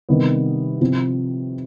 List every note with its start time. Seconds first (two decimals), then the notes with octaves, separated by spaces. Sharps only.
0.09 C3 D#3 G3 B3
0.81 C3 F3 C4